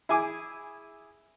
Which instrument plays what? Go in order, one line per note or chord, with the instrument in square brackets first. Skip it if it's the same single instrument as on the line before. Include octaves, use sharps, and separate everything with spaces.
[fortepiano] E4 G#4 G#5 D6